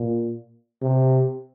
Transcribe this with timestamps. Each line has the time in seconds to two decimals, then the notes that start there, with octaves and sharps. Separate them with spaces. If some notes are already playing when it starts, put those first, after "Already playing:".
Already playing: A#2
0.82 C3